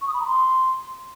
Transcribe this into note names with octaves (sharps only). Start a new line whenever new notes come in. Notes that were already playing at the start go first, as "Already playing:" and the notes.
C#6
D#6
B5
A#5
C6